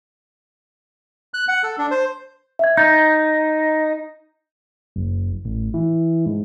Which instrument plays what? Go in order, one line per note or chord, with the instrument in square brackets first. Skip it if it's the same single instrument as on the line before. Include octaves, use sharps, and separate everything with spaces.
[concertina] F#6
F#5
A4
D4
C5
[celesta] E5 G#6
[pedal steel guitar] D#4 [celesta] G6 A6
[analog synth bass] F#1
A1
E3
G#2